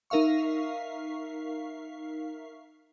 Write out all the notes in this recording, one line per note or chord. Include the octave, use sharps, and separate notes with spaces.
D#4 A#4 E5 F5 C#6